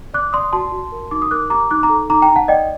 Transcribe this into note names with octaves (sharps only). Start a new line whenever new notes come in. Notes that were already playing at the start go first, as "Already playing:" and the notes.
D5 D6 F#6
D5 C6 D#6
F#4 A5 C6
F#4
A#4
D#4 D6
D#6
A#4 D6 F#6
G4 A#5 D6
D#4 D6 F#6
A#5 D6
A4
D#4 A#5 D6
G5 A#5
D#4
F#5 A5
D5 D#5 G5